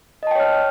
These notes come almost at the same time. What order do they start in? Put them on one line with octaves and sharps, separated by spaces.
D#5 A5 G5 C#5 F6